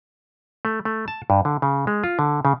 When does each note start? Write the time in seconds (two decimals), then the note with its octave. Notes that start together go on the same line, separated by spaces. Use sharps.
0.65 A3
0.85 A3
1.08 A5
1.30 G2
1.45 D3
1.62 C#3
1.87 G#3
2.04 F4
2.19 D3
2.45 C#3